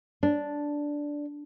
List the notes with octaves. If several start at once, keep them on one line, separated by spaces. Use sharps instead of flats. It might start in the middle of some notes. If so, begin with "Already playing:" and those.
D4